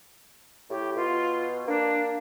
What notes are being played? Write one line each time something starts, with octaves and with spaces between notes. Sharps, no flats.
A2 G4
B2 F4
A#3 D4